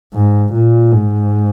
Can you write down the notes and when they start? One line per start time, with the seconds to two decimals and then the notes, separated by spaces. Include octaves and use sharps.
0.14 G#2
0.53 A#2
0.91 G#2